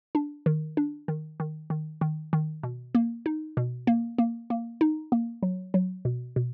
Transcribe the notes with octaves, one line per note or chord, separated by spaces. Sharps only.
D4
D#3
D4
D#3
D#3
D#3
D#3
D#3
B2
A#3
D#4
B2
A#3
A#3
A#3
D#4
A#3
F#3
F#3
B2
B2